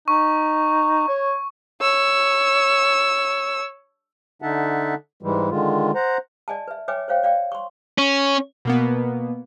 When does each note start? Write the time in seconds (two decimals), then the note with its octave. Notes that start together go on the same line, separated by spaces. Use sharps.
0.08 D#4 C#6
1.08 C#5
1.82 C#5 E6
4.42 D3 D#4 E5 F#5 A5
5.23 G#2 E3 G3 G#3
5.50 D3 D#3 G#3 F4
5.95 C5 F#5 A#5
6.48 D5 D#5 G#5 A5
6.68 B4 E5
6.88 B4 C#5 E5 G5 G#5 D6
7.08 C5 C#5 F5 G5
7.23 D5 F5 G5
7.52 C6 C#6
7.98 C#4
8.65 B2 A#3 B3